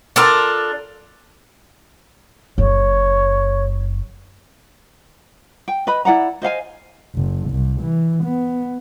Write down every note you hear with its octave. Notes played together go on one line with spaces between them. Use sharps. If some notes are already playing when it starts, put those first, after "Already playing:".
D4 F4 A4 A#4
F#1 F#2 C#5
G5
B4 D#5 B5
E4 D5 F#5 A#5
C5 D#5 F5 G#5
F#1
C2
E3
B3